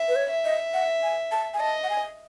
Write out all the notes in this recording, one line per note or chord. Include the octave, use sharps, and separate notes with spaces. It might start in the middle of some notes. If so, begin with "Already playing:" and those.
Already playing: E5
B4
C#5
E5
D#5
F#5
G#5
A5
G#5
D#5 A5
F#5
G#5